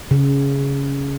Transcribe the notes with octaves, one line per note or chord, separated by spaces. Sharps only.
C#3